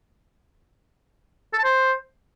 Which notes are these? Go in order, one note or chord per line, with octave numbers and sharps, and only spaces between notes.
A4
A5
C5